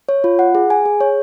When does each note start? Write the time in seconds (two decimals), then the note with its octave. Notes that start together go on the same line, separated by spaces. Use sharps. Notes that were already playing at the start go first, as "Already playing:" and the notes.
0.09 C#5
0.24 F4
0.39 F#5
0.55 G#4
0.70 G#5
0.86 G#4
1.01 C#5